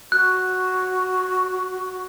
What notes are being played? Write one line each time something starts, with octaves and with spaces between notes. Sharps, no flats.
F#4 F#6